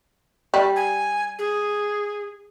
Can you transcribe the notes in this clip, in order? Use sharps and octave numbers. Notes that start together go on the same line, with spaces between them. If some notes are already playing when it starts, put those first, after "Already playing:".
G3
G#5
G#4